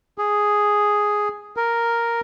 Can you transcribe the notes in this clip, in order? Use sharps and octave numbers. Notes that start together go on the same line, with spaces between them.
G#4
A#4